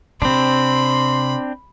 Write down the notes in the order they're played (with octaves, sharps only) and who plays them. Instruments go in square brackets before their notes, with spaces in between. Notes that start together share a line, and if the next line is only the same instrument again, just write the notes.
[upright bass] C3 [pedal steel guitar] C4 D4 [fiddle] B5 [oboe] C6